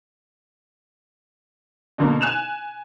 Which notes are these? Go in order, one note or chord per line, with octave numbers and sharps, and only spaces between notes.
B2 D3 A#3
G#5 F#6 E7 F7